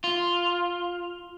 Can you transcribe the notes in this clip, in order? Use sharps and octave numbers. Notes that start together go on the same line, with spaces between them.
F4